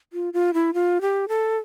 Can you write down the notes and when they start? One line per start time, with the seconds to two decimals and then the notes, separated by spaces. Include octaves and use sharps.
0.13 F4
0.33 F4
0.54 E4
0.74 F4
1.01 G4
1.29 A4